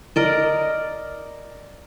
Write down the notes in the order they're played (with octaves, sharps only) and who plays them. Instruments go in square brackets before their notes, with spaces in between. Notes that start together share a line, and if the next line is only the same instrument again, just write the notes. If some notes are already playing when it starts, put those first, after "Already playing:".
[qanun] A#4 D5 D#5